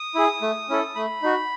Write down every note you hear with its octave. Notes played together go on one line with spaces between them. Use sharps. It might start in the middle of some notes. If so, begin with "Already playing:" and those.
Already playing: D#6
E4 G#4
A3
C#4 E4 A4
A3 B5
D#4 F#4